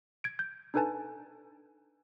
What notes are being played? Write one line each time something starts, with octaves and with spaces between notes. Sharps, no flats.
G#6 D7
G6
D4 D#4 A4 B4 G#5 A5